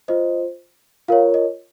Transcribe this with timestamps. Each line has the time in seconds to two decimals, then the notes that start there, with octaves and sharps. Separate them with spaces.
0.08 F4 C5 D#5
1.08 F4 A#4 C#5 F5
1.34 D#5